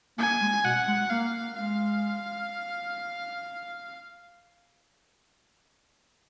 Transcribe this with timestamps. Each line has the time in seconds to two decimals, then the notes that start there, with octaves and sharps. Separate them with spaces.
0.18 A#3 G#5
0.41 G#3
0.65 B2 F#5
0.88 G#3
1.10 A#3 F5
1.56 G#3 F5